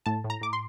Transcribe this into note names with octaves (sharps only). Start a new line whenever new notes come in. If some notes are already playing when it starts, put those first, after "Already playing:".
A2 A5
A2
A#5
A2 D6
C6